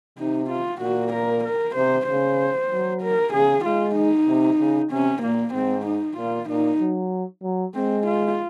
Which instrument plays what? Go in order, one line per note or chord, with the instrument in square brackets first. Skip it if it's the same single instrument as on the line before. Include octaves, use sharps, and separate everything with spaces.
[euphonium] C3 [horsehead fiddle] D#4
[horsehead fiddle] F4
[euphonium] A#2 [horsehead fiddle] F#4
[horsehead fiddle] A#4
A#4
[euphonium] C3 [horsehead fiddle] C5
[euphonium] C#3 [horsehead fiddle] C5
[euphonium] F#3
[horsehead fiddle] A#4
[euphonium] C#3 [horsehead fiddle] G#4
[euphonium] G#3 [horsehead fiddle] F4
[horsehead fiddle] D#4
[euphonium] C3
C#3
[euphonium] C3 [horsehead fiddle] C#4
[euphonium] A#2 [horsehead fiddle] A#3
[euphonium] G#2 [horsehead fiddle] C4
[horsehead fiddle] D#4
[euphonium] A#2 [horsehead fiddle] F4
[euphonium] A#2 [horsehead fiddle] D#4
[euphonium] F#3
F#3
[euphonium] G#3 [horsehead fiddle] C4
[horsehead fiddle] F4